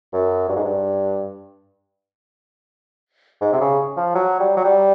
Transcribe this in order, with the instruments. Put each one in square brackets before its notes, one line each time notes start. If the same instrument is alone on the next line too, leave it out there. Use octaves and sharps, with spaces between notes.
[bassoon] F#2
G2
G#2
G2
G#2
C3
C#3
F3
F#3
G3
F#3
G3